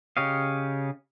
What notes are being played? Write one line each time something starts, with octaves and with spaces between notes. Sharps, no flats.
C#3 G4 C#5 D#5 F5